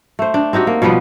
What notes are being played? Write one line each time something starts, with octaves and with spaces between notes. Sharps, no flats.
A3 C5
D4
C4 D#4 F#4 G4
A#3
B2 F3 G3 B3